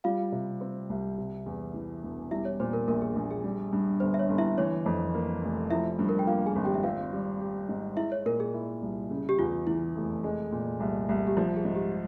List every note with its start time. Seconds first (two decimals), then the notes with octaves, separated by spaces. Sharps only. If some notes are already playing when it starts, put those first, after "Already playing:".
0.04 G3 F4 F5
0.32 C3
0.61 C4
0.90 C2
1.18 C3
1.46 E2
1.74 E3
2.03 E1
2.31 G3 E4 E5
2.45 C#5
2.60 A#2 C5
2.73 A#4
2.87 A#1 A#4
3.02 G#4
3.16 A#1
3.31 G#4
3.44 G3
3.73 G2
4.00 G1 C5
4.14 E5
4.19 C#5
4.29 G1
4.38 E4 E5
4.58 E3 C#5
4.86 F2
5.14 A#3
5.43 F1
5.70 F3 E4 E5
5.99 G2
6.09 A#4
6.19 G5
6.27 A#3 F4 F5
6.46 G#4 G#5
6.56 G#1
6.65 G4 G5
6.74 E5
6.83 C4 F4 F5
7.13 G3
7.40 G4
7.69 G#2
7.97 G#3 E4 E5
8.12 C#5
8.25 A#2 A#4
8.40 G#4
8.54 E4
8.82 C2
9.11 C#3
9.29 G4
9.39 E2 F4
9.67 E3 E4
9.95 F1
10.24 G#3
10.52 A#2
10.80 C2
11.09 C2
11.27 G4
11.37 F3 F4
11.56 G#4
11.65 G#2
11.75 G4